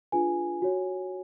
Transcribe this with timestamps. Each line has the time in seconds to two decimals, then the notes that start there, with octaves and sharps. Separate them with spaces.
0.12 D4 F4 G#4 B4 G#5
0.62 F#4 C#5